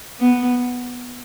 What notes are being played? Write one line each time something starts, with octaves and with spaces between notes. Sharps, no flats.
B3